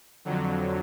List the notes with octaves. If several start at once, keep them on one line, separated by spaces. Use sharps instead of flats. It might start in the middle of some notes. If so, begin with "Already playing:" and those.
F2 D3 F#3